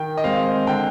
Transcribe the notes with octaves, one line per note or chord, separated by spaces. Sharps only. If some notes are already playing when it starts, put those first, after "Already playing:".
Already playing: D#3 G5
D#5
G#3 C4 F5
D3 G5